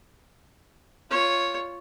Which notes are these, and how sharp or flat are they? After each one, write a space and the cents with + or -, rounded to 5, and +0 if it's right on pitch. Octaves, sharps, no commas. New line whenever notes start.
F4 +0 C#5 +0